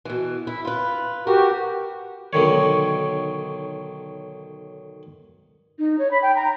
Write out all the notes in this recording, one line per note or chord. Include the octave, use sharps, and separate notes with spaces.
B2 E3
E4
F4 B4
F#4 G4 A#4
B1 D3 D#3 C#5
D#4
C#5
B5
G5
A#5